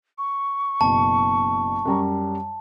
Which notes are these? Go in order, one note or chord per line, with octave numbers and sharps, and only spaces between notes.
C#6
F#1 B2 A5
F#2 G3 A#5